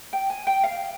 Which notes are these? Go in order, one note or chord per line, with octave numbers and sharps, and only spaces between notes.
G5
G#5
G5
F5